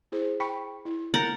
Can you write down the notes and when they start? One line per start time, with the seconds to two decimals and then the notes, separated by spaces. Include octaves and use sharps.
0.12 E4 G#4 C5
0.40 G5 B5 C#6
0.85 E4
1.14 A#4 F#5 A#5 G6 A6